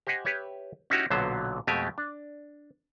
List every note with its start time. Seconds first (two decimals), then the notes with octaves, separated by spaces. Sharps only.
0.07 G4 C5 D#5 F#5 G#5
0.25 G4 B4 C#5 E5
0.90 C#4 D#4 E4 F#4 G4
1.10 B1 A#2 D3 F#3 B3 C5
1.67 F2 B2 G#3 A3 G4 G#5
1.98 D4